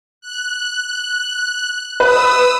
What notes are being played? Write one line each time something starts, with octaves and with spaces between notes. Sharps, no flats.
F#6
B4 D#6 E6